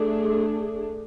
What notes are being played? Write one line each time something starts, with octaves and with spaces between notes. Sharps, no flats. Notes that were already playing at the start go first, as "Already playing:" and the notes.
Already playing: A3 D4 G#4